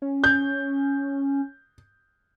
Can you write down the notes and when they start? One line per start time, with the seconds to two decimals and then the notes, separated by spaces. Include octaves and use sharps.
0.02 C#4
0.24 G6